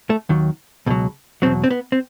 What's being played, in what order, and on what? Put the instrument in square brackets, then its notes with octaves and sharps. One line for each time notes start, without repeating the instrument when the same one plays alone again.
[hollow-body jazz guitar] A3
D#2 D#3 F#3
C#2 B2 F#3
E2 B2 F#3 C4
C4
B3
C4